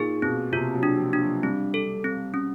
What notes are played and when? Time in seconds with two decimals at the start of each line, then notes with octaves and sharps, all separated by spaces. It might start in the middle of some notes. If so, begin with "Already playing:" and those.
Already playing: A#2 D#4 G#4
0.22 B2 C4
0.52 C3 F4
0.75 F#3
0.83 D4
0.97 F3
1.13 D4
1.21 F#3
1.43 G3 C4
1.74 A4
2.04 C4
2.34 C#4